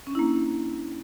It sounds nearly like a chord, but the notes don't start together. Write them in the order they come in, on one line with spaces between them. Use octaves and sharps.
C#4 D4 E4 A#3